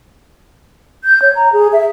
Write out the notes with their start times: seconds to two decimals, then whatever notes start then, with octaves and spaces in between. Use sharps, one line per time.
1.04 G6
1.22 C#5
1.36 A#5
1.53 G#4
1.73 E5